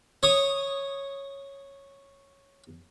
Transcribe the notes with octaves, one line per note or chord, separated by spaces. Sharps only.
C#5 D#6